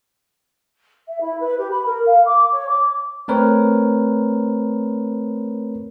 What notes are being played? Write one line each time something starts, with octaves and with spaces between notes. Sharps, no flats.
E5
E4
B4
G4
B5
A#4
F5
D6
C#5
D6
A3 C4 A#4 B4 C#5